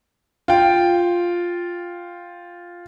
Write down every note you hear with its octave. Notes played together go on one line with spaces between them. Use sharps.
F4 G5